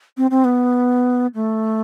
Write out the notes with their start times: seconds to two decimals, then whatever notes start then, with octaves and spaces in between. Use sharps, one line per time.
0.17 C4
0.31 C4
0.45 B3
1.35 A3